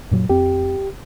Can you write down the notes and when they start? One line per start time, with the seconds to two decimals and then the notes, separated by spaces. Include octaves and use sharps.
0.11 F#2 A#2 F#3
0.29 F2 C4 G4